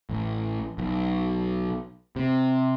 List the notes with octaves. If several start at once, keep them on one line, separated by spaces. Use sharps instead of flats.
A1
B1
C3